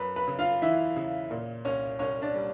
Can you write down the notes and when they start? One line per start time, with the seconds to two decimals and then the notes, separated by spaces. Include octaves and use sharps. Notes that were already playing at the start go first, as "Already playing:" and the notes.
Already playing: F#2 B4 B5
0.16 B4 B5
0.28 C#3
0.39 F4 F5
0.62 E3 E4 E5
0.96 C#3
1.31 A#2
1.65 C2 C#4 C#5
1.99 C2 C#4 C#5
2.22 D4 D5
2.34 G3